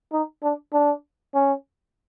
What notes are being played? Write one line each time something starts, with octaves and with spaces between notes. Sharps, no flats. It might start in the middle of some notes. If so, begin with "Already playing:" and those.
D#4
D4
D4
C#4